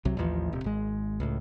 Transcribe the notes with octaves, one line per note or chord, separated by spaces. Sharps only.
C2 C3 F#3
A1 D#2 E3 F3
D#1 C3
G#1 G#3
C#2 A2